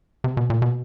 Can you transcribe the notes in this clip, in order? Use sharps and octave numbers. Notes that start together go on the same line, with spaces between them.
C3
B2
A#2
B2